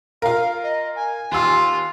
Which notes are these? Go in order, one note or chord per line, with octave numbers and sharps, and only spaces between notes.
F4 A#4 F5
D#5
G#5
D#2 F4 E6